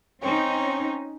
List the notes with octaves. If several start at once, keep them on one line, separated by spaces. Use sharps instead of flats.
C4 C#4 D#4 C#5